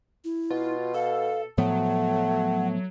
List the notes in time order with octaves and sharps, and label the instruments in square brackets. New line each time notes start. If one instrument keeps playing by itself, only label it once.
[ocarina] E4
[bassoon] B2 [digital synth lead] F4
[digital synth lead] A4 [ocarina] F5
[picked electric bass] A2 F3 B3 [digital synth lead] F#3 [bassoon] A3 [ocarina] F#5